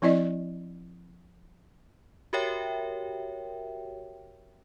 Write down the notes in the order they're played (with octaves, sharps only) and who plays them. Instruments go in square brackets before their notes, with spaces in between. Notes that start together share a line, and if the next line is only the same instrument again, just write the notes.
[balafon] F3 C4 E4 D5 D#5
[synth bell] F#4 G4 A#4 C#5 E5 G5